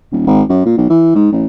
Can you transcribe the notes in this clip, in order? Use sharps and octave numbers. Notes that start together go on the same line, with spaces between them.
D#1
G#1
F#2
A#2
B1
E3
G#2
A1